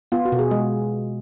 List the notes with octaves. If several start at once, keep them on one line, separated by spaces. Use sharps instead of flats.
B3 F4
F#4
B2
G#4
G#3